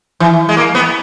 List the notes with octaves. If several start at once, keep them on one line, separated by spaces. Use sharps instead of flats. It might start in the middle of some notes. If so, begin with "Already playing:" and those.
E3
G#3
A#3
B3